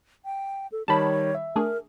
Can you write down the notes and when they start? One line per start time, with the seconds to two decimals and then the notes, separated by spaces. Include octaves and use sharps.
0.25 G5
0.72 A4
0.88 D#3 G3 C#5 A5 B5
1.35 E5
1.56 A3 D4 G#4 A#4